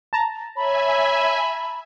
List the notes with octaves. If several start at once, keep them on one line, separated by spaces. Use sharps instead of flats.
A5 A#5
C#5 E5 G#5 B5